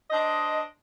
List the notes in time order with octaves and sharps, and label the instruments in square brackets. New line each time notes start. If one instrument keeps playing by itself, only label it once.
[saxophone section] D4 C5 D#5